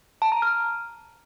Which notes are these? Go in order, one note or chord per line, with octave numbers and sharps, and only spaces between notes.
A5
A#5
F6